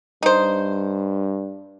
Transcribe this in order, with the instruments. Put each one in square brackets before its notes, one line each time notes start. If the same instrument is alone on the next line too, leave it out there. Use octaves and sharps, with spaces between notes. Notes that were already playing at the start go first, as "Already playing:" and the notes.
[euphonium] G2 [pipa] D#4 C5